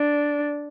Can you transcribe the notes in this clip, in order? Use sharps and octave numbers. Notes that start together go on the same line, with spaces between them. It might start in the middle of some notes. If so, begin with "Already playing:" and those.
Already playing: D4